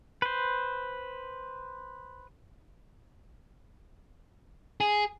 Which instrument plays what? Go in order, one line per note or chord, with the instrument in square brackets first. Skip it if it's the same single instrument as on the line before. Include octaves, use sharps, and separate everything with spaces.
[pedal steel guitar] B4 C5
[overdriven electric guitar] G#4